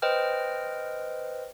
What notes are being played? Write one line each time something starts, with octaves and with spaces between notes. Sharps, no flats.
B4 C5 D#5 G5 F6